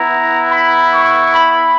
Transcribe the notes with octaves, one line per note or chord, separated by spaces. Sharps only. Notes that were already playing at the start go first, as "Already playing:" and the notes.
Already playing: B3 E4 A#5
B5
C#6
B5